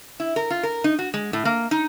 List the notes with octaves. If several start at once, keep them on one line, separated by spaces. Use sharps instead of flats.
E4
A#4
F4
A#4
D#4
F#4
G#3
A2
A#3
D#4